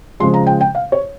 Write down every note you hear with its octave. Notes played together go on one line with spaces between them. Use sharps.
C#3 F3 G#3 C6
A#5
G5
G5
F5
C#5